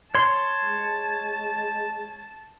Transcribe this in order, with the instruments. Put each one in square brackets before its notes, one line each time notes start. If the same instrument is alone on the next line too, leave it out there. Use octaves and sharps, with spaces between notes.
[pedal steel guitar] C#5 C6 [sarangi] A5
[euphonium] G#3